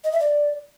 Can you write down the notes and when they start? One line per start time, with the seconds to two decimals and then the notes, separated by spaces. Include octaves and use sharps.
0.04 D#5
0.12 E5
0.20 D5